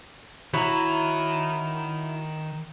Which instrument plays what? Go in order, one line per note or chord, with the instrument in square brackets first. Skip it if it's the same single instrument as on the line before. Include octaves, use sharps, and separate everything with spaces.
[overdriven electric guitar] D#3 A#5 [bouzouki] E4 F#4 C#5